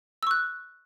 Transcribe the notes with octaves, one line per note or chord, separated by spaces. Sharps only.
C#6 E6 F#6